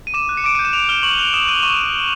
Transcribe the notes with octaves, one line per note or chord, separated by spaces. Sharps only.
D#7
D6 E7
F#6
C#7
D6 D7
G6 D#7
E7
D6 F7
F6 G7
C#6 F#7
F#6 F7
D#6 E7
F#6 D#7
C#6 D#7